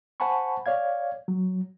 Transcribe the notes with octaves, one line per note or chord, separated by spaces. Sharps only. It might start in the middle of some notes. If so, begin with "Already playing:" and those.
C5 F#5 G#5 A5 B5 C#6
C#5 D5 F5 G#6
F#3